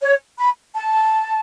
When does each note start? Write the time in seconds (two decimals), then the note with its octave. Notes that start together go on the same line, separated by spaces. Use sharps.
0.02 C#5
0.39 B5
0.74 A5